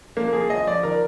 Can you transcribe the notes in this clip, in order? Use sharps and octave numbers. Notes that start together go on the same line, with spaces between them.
F3 A#3
F3 G#4
F3 D#5
F3 D5
D#3 A#4